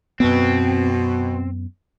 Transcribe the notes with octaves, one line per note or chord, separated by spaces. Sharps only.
F#2 B2 B3 C4